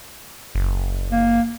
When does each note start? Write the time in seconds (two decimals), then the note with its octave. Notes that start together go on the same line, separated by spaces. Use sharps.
0.55 F#1
1.11 A#3